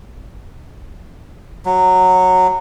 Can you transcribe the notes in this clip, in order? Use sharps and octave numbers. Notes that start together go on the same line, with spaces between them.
F#3